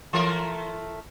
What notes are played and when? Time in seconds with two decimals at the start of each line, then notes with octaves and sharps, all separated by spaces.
0.13 E3 A3 A#4